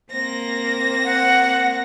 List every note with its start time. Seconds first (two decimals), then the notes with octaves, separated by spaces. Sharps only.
0.12 A#3 C4 A#6
1.05 F#5